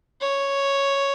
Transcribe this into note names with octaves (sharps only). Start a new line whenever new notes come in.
C#5